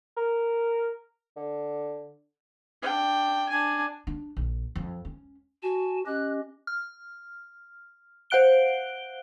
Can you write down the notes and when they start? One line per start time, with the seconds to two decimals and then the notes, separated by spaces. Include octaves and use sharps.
0.17 A#4
1.37 D3
2.82 D4 G5
3.49 D4 G#5
4.07 D4
4.37 A#1
4.75 F2
5.05 C#4
5.63 F#4 G#5 A5
6.06 C#4 G4 D#5 F#6
6.67 F6
8.30 C5 F5 F#5 F#6 D7 G7